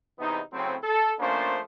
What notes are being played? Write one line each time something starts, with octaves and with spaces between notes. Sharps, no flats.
E2 C3 E3 B3 D#4
A2 C#3 F#3 C4
A4
F3 A3 A#3 C#4 D4 C5